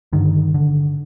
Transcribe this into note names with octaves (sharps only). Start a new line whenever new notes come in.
G2 D3 D#3
D3